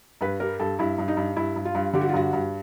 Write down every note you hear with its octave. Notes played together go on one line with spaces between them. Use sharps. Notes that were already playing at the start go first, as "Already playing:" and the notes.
G2 B4
G3 A#4
G2 A4
G2 E4
G2
D#4
G2
G2 E4
G2
F4
G2
D3 G4
F#4
F4
G2 F#4
G2